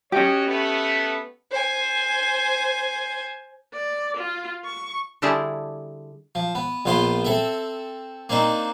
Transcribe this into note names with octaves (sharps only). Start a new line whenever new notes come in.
C#4 F#4 G4 C#5 D#5
A3 B3
C5 G#5
D5
F4
C#6
D3 G3 E4 G4 G#4 A5
F3
B3
A#1 B3 F4 C5 C6
C4 A4 E5
A#3 C4 D4 D#4